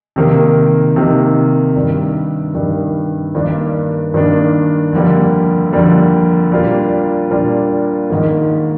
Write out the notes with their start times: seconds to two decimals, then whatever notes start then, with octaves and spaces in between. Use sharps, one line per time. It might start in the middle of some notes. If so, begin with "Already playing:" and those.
0.16 C3 D#3 A#3 D#4
0.96 C3 D#3 A#3 D#4
1.75 G2 D#3 G3
2.55 G2 D#3 G3
3.35 G2 D#3 A#3 D4
4.14 G2 D#3 A#3 D4
4.93 F2 D3 G3 A#3
5.73 F2 D3 G3 A#3
6.52 A#2 G3 A#3 D4 F4
7.31 A#2 G3 A#3 D4 F4
8.10 G#2 D#3 A#3